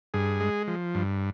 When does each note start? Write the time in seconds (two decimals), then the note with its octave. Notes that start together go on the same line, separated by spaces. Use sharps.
0.14 G2 G#4
0.40 G#3
0.68 F3
0.95 G2